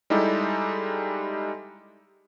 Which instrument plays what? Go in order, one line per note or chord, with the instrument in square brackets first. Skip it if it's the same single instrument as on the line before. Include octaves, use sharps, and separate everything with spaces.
[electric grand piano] G3 G#3 D#4 E4 G4 A4